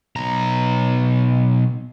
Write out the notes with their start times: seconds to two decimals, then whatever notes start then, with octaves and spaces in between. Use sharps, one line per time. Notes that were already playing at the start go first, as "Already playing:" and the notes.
0.16 B1 A#5